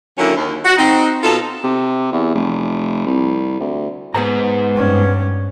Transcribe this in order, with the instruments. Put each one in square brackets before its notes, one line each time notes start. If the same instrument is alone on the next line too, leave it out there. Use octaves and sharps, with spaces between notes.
[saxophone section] D3 D#3 F#3 A#3 C#4 E4
D#2
F#4
C4 D#4
B2 D#4 F4 A4
[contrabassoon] C3
E2
F1
C2
D2
[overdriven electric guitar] G#2 [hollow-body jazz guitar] B3 C5 A#5
[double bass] G2 C#4